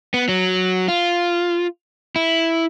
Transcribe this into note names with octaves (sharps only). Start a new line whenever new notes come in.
B3
F#3
F4
E4